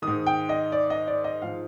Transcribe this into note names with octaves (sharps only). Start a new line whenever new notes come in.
G#2 D#3 D#6
G5
D#5
D5
D#5
D5
D#5
G#2 F3 F5